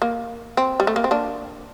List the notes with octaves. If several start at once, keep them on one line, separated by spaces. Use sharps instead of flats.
A#3
C4
G3
A3
A#3
C4
A#3 D4